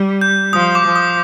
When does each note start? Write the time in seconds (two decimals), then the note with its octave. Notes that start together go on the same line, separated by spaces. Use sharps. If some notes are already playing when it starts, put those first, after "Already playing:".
Already playing: G3
0.21 G6
0.53 F3 D#6
0.75 D6
0.85 F3
0.96 D#6